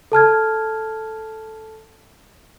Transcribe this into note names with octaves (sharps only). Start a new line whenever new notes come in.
A4 A5 F6 G#6